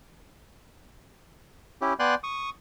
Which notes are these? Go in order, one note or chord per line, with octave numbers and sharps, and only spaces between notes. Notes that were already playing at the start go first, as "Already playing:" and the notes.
C#4 E4 G4
B3 D5 G5 G#5 C6 F#6
C#6 D#6